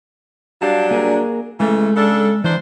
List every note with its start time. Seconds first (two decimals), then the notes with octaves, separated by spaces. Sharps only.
0.62 F#3 G3 D4 F5 A5
0.91 A#3 G#4 A#4
1.60 C#3 E3 G#3 A3
1.96 C#3 D4 A4
2.44 D#3 E3 D4 C5